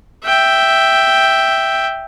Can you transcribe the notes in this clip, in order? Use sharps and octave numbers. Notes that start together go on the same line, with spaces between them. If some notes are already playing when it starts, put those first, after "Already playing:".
E5 G5